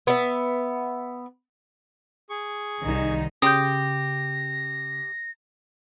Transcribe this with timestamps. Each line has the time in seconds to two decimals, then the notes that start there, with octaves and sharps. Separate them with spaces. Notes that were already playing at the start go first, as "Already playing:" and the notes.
0.07 B3 E5
2.30 G#4 C#6
2.83 C2 D#3 D#4
3.42 C#3 G4 C6 D#6 G6 A#6